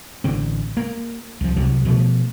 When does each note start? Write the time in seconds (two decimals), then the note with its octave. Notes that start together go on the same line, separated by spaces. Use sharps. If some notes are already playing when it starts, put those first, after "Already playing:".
0.24 A1 D3 C4
0.77 A#3
1.41 C2 F3
1.56 C2 C3 F#3
1.85 B2 F3 G#3 A3